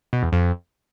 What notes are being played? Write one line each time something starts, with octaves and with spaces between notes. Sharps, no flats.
B2
E2
F2